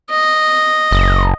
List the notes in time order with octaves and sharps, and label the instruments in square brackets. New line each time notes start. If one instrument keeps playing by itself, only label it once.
[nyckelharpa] D#5
[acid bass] F#1